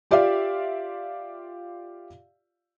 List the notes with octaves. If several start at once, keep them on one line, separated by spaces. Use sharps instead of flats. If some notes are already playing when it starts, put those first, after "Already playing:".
F4 G4 D5 E5 F5